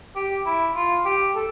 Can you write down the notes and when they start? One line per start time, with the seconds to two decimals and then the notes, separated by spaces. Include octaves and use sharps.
0.16 G4
0.46 E4
0.75 F4
1.05 G4
1.36 A4